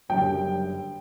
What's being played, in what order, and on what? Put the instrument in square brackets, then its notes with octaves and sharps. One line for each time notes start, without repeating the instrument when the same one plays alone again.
[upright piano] F#1 F#2 D3 G3 G5